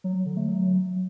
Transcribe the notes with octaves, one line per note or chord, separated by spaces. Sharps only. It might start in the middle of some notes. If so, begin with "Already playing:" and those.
F#3
F#3
D3
A3
F#3